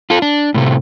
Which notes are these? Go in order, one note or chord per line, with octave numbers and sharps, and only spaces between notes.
F4 A4
D4
A2 C3 A3